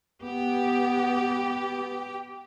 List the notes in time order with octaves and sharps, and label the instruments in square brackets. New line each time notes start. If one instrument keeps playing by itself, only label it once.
[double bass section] B3 [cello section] G4